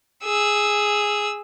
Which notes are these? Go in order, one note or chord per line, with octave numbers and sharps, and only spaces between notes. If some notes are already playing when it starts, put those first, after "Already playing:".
G#4 E6